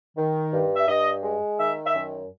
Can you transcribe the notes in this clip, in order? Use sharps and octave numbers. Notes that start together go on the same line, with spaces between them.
D#3
G2
E5
G2 D#5
G#3
D#3 E5
E5
F#2